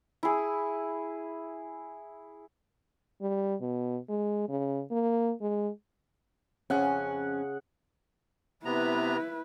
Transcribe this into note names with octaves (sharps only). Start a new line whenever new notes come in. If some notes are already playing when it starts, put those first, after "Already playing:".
E4 G#4
G3
B2
G#3
C#3
A#3
G#3
F2 C#3 C#4 F#5
C3 B3 E4 B4 A#5